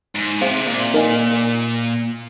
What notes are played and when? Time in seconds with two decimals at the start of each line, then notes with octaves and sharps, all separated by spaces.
0.15 G#2
0.41 C3 G#4 C5 F5
0.67 A#2
0.94 D#4 A#4 D#5 G#5